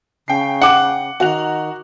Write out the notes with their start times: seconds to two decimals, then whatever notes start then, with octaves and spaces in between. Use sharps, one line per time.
0.28 C#3 G5 C7
0.62 F#5 D6
1.20 D#3 F#4 F#6 F7